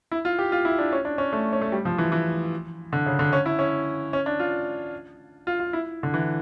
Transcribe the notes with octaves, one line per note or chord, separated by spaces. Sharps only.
E4
F4
G4
F4
E4
D4
C#4
D4
C#4
A3
C#4
A3
G3
F3
E3
E3
D3
C#3
D3
C#4
E4
C#4
C#4
D4
F4
F4
F4
E4
D3
E3